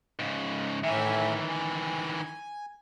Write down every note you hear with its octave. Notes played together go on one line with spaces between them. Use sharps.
G#2 C#3
A2 D#3 E3 E5 G#5
G#5